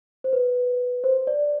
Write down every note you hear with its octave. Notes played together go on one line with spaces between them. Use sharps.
C5
B4
C5
D5